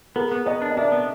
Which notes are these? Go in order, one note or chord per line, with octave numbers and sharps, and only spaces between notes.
B3 G#4 A#4
B3
B3 C#5 D#5
D4
D#5
D4 D5 E5
B3